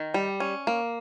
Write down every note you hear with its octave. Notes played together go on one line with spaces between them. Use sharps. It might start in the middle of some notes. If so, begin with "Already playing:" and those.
Already playing: D#3
G3
C#4
A#3